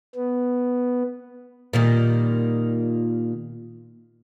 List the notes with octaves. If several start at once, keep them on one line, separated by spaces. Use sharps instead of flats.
B3
A#2 D#3 G3